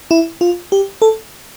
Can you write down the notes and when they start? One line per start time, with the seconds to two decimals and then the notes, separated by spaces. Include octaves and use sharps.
0.11 E4
0.41 F4
0.72 G4
1.02 A4